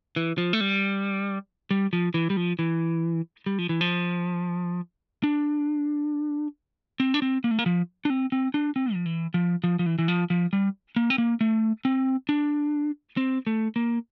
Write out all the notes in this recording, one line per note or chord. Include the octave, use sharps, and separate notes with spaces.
E3
F3
A3
G3
G3
F3
E3
G3
F3
E3
G3
F3
E3
F3
D4
C4
D4
C4
A#3
A3
A#3
F3
D4
C4
C4
D4
C4
F3
E3
F3
F3
F3
E3
E3
F3
F3
G3
A#3
C4
A#3
A3
C4
D4
C4
A3
A#3